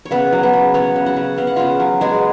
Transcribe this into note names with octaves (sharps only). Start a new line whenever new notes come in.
C#5
C#3 B3 B4
F#3
B3 B4
C#3
B3 C#4 C#5
C#3
F#4 F#5
C#3
B3 F5
F#5
C#3 F4 F5
F#3
G#3 B3 G#4